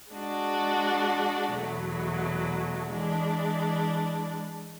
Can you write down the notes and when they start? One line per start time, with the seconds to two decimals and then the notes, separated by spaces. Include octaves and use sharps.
0.11 G#3 D4 F#4
1.51 E2 B2 F#3 A3
2.90 E3 G#3 D4